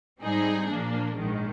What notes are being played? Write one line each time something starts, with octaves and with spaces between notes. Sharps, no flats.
G#2 G3 C4 D#4 G#4
A#2 F3 A#3 D4
A#1 G#2 D#3 G#3